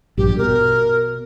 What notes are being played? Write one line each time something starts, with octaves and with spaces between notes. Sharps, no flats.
A#1 G2 G4
B2 A#4